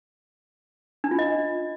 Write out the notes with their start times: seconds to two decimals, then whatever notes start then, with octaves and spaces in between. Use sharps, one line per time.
1.04 D4
1.11 F4
1.19 D#5